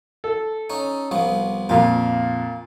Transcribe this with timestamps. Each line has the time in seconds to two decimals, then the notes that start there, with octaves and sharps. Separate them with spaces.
0.24 A4
0.70 C#4 D#4
1.11 C2 F3 B3
1.69 F2 A#2 F4